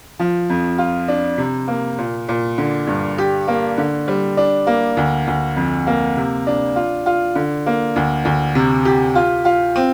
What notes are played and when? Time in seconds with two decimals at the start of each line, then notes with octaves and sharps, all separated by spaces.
0.19 F3
0.49 F2
0.78 F4
1.08 D4
1.38 C3
1.68 A#3
1.98 A#2
2.29 A#2
2.58 D3
2.87 G2
3.18 G4
3.48 A#3
3.78 D3
4.08 G3
4.37 D4
4.67 A#3
4.97 D2
5.27 D2
5.56 F2
5.87 A#3
6.17 C3
6.47 D4
6.76 F4
7.06 F4
7.35 D3
7.66 A#3
7.96 D2
8.25 D2
8.55 C3
8.85 G4
9.15 F4
9.45 F4
9.76 C4